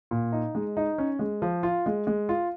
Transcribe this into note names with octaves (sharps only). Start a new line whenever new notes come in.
A#2
D#4
G#3
D#4
C#4
G#3
F3
F4
G#3
G#3
F4